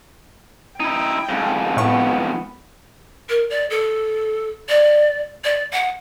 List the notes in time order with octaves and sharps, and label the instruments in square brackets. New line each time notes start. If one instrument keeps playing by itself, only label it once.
[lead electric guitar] D#4 E4 [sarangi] G5
[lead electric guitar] F2 G#2
[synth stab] A2 C#6 [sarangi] B3
[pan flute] A#4
D5
A4
D5
D5
F#5